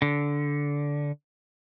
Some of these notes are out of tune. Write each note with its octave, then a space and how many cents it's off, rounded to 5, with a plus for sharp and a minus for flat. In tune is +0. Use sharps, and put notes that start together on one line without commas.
D3 -15